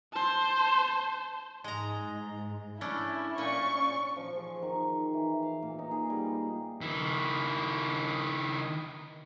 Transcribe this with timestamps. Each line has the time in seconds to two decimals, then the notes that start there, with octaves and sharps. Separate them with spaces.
0.13 C5 A5
1.64 G#2 G#3 A#5
2.81 A3 C#4 D4 E4
3.38 A#2 C#4 D5 C#6
4.17 F3
4.36 G#4
4.62 D#3
5.14 E3
5.42 F5
5.62 A#2
5.79 D#4
5.91 G#4
6.10 G3
6.81 D#3 E4